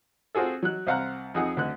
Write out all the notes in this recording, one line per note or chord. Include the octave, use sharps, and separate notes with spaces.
C4 F4 F#4 G#4 A4
F#3 F#6
C2 C5 F5 F#5 A#5 F#6
F2 D#4 G#4 F#5
D2 D3 F#6